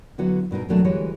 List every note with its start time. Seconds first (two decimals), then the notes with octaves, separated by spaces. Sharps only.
0.18 D3 F#3 B3 E4 F#4
0.51 G2 B2 D#4 A#4
0.69 D#2 B2 F#3 A3 D4 A5
0.85 D2 E3 G3 G#3 F#4 C#5